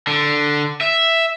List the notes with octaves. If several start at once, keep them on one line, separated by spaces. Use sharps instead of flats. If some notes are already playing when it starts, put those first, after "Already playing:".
D3
E5